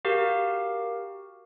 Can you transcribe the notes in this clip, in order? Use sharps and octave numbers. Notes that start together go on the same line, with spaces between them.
F#4 G4 A#4 F5